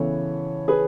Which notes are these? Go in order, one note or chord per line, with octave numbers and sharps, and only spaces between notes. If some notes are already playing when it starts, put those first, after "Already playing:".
Already playing: C#3 E3 B3 A4 C#5
G#4 B4